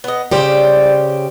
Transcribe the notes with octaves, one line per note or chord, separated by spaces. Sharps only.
B3 D#5
C#3 G3 G4 C5